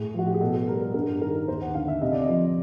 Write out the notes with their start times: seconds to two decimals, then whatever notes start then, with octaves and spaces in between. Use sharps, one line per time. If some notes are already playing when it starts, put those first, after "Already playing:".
Already playing: A2 G#4
0.14 F3 F#4
0.26 G4
0.34 G#4
0.41 B2 A4
0.62 A4
0.68 G3 A#4
0.94 G2 A#4
1.21 D#3 A#4
1.48 D#2 C5
1.62 F#5
1.75 D3 F5
1.88 E5
2.01 C3 D#5
2.13 D5
2.24 F3 D#5